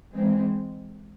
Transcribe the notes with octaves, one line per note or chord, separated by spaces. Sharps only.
E3 G#3 C4